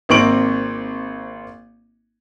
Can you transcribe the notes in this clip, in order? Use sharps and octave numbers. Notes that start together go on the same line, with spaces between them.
G#1 A#3 C4 C#6 D7 F#7